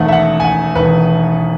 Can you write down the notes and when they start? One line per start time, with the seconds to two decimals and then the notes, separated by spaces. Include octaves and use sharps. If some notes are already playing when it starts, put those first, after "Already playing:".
Already playing: E1 E2 D#3 A3 F#5
0.08 E5
0.12 F#5
0.40 G#5
0.44 F#5
0.76 E1 E2 D#3 A3 B4